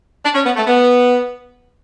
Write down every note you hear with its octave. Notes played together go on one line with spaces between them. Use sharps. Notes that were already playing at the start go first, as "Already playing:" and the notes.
D4
C#4
B3
A3
B3